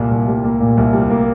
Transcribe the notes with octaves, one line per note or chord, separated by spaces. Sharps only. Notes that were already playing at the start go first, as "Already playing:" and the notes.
Already playing: C2 A#2 G3 A#3
C2
G3
A#3
A#2
C2
G3
A#3